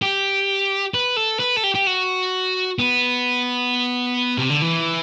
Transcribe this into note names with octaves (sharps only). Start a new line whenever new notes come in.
G4
B4
A4
B4
A4
G4
G4
F#4
B3
C3
D3
E3